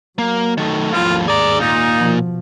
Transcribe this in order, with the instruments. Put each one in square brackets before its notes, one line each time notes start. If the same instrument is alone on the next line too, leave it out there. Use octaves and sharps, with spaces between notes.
[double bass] F#3 [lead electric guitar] A#3
[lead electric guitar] D#3 A3
[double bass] G#1 D#2 [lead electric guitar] A2 F3 [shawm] F4
[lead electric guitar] G#4 A#5 [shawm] D5
[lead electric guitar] A#2 [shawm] D#4
[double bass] B2 F3